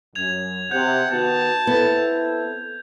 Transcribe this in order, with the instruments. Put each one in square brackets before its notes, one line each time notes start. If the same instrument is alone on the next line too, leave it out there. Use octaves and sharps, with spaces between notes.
[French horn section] F#2 [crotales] G#6 F7
[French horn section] C3 [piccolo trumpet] F#5 [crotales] G6
[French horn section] D#3 B3 F#4 [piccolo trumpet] A5
[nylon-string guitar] B3 [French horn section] C4 E4 A4